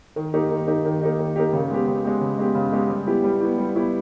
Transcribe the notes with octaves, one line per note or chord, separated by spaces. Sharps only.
D#3
A#3 D#4 G4
D#3
A#3 D#4 G4
D#3
A#3 D#4 G4
D#3
A#3 D#4 G4
C#3
G#3 B3 G4
C#3
G#3 B3 G4
C#3
G#3 B3 G4
C#3
G#3 B3 G4
G3
B3 E4 G4
G3
B3 E4 G4
G3
B3 E4 G4